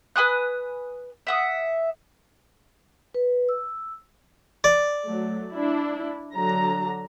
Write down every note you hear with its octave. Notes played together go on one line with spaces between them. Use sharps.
B4 G#5 D#6 F#6
E5 F#5 D#6
B4
E6
D5
F#3 A3
D4 E4
D3 F#3 A#5